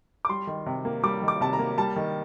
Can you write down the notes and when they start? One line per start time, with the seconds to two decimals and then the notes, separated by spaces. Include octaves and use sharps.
0.25 D6
0.29 G3 C6
0.47 D#3
0.66 C3
0.85 A#3
1.03 G3 D6
1.22 D#3
1.28 D6
1.41 C3 A5
1.53 A#5
1.59 A#3
1.78 G3 A5
1.96 D#3